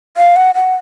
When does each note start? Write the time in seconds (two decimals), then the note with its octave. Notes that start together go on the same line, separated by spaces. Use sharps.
0.17 F5
0.36 F#5
0.55 F#5